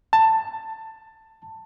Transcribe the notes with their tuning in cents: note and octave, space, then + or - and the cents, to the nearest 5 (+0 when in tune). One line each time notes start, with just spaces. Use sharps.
A5 +15